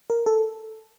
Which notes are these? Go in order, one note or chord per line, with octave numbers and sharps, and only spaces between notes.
A#4
A4